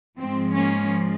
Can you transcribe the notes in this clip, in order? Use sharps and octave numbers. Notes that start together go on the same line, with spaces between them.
G#2 F3 G#3 C4
A#3 C#4